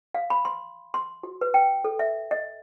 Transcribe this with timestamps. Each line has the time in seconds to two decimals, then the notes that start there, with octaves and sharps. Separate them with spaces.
0.14 F5
0.30 B5
0.45 C6
0.94 C6
1.23 F#4
1.41 B4
1.54 G5
1.84 A4
1.99 E5
2.31 D#5